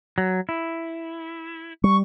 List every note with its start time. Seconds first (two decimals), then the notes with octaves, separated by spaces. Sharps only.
0.18 F#3
0.49 E4
1.84 G3 C#6